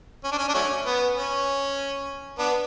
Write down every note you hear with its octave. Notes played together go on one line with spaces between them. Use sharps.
C#4
D4
C#4
D4
F#3 A3 C#4
B3
C#4
B3 D4